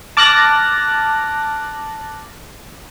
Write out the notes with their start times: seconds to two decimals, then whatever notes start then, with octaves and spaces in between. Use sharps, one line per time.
0.17 A5 D6 F6 F#6 A6 A#6